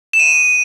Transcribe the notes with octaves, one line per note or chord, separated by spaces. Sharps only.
E7
D#7